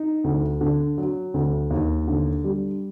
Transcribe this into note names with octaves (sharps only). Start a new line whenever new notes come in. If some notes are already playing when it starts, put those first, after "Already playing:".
Already playing: D#4
D2
D3
F#3
D2
D#2
D3
G3